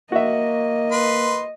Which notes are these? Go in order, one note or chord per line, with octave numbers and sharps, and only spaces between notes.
A#3 F#4 D#5 E5
B4 C6